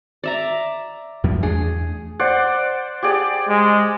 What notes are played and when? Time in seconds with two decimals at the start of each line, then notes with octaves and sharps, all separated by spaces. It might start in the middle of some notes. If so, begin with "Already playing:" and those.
0.24 D5 E5 A#5
1.24 F#2 F3
1.43 E2 A3 D4 G#4
2.19 C5 D5 F#5
3.03 G4 G#4 D5
3.49 G#3